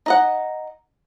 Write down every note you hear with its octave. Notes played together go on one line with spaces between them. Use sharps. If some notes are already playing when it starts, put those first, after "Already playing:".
D#4 D#5 F#5